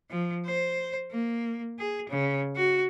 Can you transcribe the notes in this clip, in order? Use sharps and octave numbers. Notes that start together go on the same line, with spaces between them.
F3
C5
A#3
G#4
C#3
F#4